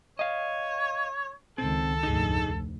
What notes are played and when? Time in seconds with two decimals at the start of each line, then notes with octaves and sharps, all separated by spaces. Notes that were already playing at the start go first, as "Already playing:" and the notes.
0.19 C#5 D#5 F5
1.58 C#2 D#3 C4 A4
2.03 F1 D2 G#2 D#4 G#4